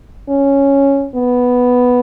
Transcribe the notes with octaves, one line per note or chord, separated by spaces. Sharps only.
C#4
B3